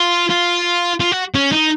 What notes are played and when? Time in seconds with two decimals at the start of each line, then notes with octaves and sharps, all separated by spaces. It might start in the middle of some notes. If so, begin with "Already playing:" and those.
Already playing: F4
0.30 F4
1.00 F4
1.12 F#4
1.35 C#4
1.52 D#4